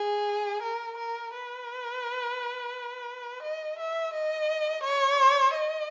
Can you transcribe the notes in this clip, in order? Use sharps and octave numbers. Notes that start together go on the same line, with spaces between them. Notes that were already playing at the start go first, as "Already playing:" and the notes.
Already playing: G#4
A#4
A#4
B4
D#5
E5
D#5
C#5
D#5